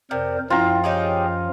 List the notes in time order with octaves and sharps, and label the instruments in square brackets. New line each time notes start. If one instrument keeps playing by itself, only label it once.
[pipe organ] F2 A#4 C5 [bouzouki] C3 [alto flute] D5
[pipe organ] F#2 F3 [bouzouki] C4 [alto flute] E4 [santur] F4 A#5
[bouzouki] D#4 G4 G#4 [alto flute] C#5